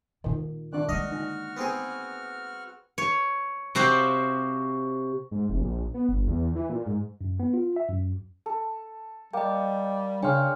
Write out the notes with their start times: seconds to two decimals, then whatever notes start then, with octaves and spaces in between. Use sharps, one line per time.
0.24 A#2 D#3 F4
0.73 D#3 D4 D5 F#6
0.89 G#3 A#3 F#4 D#5 F6
1.11 D3 D#4
1.57 B3 C4 G#4
2.98 C#5
3.75 C3 F#4 G4 C5 F5
5.31 G#2
5.49 F1
5.61 A#1
5.94 B3
6.09 G1
6.27 E2
6.55 E3
6.69 A#2
6.86 G#2
7.21 F#2
7.40 B3
7.54 F4
7.76 E5
7.89 F#2
8.46 A4
9.33 G3 A#3 D#5 G5
10.23 C#3 D4 C#5 G5 G#5 C6 F6